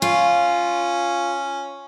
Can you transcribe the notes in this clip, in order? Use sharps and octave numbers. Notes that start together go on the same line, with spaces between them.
C#4 F4